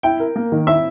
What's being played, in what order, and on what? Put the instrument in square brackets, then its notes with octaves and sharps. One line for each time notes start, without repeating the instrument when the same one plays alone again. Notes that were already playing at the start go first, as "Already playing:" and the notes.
[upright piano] E4 [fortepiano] G5
[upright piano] A#4
A#3
D#3
[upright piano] E4 [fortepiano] E5